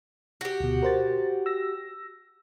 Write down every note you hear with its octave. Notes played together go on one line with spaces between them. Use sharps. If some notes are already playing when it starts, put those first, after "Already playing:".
F#4 G4
D2 B2
A#4 C5 A6
E6 A#6